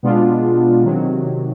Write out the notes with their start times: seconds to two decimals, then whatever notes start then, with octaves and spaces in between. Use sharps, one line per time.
0.03 B2 G#3 B3 D4 F4
0.83 C3 D#3 F#3